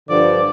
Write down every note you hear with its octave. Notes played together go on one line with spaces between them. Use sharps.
G2 D3 F3 D5